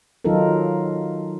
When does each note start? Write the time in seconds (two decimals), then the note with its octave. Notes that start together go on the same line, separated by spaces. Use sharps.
0.25 D#3 F#3 D#4 F4 A4 A#4